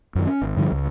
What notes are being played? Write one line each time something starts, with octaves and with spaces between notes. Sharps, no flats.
F#2 D#3
C#4
G#1
G2 D3 E3 F3
C#2